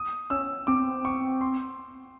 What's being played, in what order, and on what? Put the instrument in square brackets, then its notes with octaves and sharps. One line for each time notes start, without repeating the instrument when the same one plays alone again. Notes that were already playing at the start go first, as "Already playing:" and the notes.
Already playing: [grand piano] D#6
[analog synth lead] C#4 [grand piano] E6
[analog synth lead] C4 [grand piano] D6
[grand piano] C#6
C6